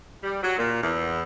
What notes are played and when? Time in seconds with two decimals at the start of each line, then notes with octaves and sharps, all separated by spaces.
0.23 G3
0.43 F#3
0.58 A#2
0.82 E2